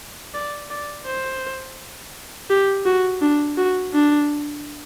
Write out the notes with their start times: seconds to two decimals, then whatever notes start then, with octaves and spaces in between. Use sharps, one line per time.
0.34 D5
0.70 D5
1.06 C5
2.50 G4
2.86 F#4
3.22 D4
3.58 F#4
3.94 D4